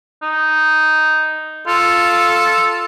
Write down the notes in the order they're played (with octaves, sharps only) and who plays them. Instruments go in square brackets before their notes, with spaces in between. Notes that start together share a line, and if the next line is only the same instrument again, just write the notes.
[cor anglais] D#4
[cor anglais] F4 [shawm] A4